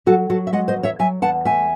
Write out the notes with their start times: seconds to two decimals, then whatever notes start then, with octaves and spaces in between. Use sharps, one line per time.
0.06 F#3 F#4 A4
0.30 F#3 F#4 A4
0.47 E5
0.52 G#3 D#5 F#5
0.68 C5 D#5
0.76 E2
0.83 C#5 E5
0.99 F#3 E5 G#5
1.22 E2 F#5 A5
1.45 A3 E5 G#5